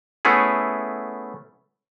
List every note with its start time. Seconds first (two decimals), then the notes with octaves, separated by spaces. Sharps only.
0.25 A3 B3 C#4 E4 G#4